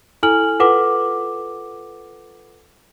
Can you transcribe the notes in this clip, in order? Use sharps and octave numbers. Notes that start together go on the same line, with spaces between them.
E4 A4 G#5 F6 F#7
F4 A4 B4 F#5 D6